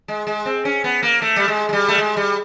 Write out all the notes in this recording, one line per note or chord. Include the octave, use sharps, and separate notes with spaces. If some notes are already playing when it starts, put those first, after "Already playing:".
G#3
G#3
C4
C#4
B3
A#3
A3
G3
G#3
G#3
G3
A3
G#3
G3